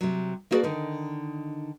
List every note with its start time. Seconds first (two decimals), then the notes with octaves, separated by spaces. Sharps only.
0.01 C3 F#3
0.51 A#3 E4 F#4 G#4 B4 D5
0.63 D3 D#3 D#4